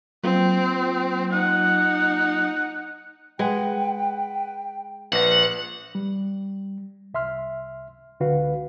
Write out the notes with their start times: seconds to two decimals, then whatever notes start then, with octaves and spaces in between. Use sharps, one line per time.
0.23 F#3 A#3 C4 F4
1.33 D#4 F#5
3.39 G#3 B4 F#5 G5
5.12 A#1 B4 F#5 A#6
5.95 G3
7.14 C2 E5 C6 F6
8.20 C#2 D3 F#4 B4 F5